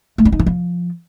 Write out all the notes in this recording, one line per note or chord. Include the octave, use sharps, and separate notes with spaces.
A3
D4
D#4
E3
F3